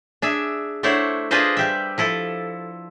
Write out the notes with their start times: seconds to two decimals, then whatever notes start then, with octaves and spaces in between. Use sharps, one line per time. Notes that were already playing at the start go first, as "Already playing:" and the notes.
0.22 D4 G#4 E5
0.83 A3 D4 E4 C5 C#5 F#5
1.31 D4 F4 G#4 B4 C5 D#5
1.57 G3 G4 E5
1.98 F3 E4 A4